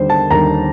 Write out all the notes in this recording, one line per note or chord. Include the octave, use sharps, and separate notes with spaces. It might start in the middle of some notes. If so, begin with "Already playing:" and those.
Already playing: D#2 D3 G3 C5
A5
D#2 D3 G3 A#5